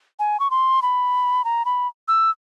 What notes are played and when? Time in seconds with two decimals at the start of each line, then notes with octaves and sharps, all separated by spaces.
0.19 G#5
0.40 C#6
0.51 C6
0.82 B5
1.45 A#5
1.65 B5
2.08 E6